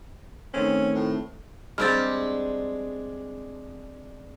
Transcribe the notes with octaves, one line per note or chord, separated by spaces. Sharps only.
D#3 A3 C4 C#4
A2
G3 G#3 C4 D4 G4 F6 A6